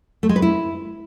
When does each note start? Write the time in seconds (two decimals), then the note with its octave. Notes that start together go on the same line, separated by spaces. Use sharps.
0.23 A3
0.29 G#3
0.36 B4
0.42 E4